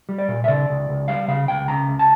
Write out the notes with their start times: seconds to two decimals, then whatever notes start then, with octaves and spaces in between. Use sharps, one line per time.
0.09 G3
0.18 D5
0.28 A#2
0.44 E5
0.48 C#3 D5
0.69 C#2
0.89 C#2
1.08 G3 F5
1.28 C#3 F5
1.48 C#2 G5
1.68 C#3 A#5
1.88 C#2
1.99 A5